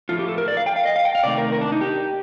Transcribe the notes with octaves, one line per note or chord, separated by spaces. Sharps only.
A2 F3 A3 F4
G4
A4
A#4
D5
F5
G5
F5
D#5
F5
G5
F5
C3 D#3 A3 D5
A#4
A#4
D4
D#4
G4